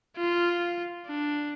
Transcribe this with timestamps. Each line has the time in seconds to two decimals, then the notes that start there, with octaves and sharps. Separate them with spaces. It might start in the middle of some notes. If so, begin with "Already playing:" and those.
0.17 F4
1.07 D4